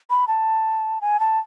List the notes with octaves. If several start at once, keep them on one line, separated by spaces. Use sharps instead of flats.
B5
A5
G#5
A5